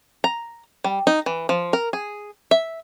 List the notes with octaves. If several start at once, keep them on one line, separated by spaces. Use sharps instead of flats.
A#5
G3
D#4
E3
F3
A#4
G#4
E5